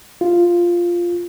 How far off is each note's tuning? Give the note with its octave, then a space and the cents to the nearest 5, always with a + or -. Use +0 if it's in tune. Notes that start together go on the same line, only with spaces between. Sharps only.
F4 -5